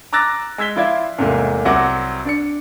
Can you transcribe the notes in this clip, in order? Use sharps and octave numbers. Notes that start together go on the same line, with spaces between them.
A#5 D6 E6 F#6 A6 A#6
G#3 E6 G#6 B6 G7
F3 E4 F4 D5 E5 G#6
E2 G#2 C3 A3 A#3
C2 F#3 C4 F#5 D6 A#6
D4 D5 C#7